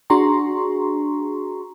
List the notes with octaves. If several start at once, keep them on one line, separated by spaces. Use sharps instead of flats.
D4 F#4 G#4 A#5 C6 C#6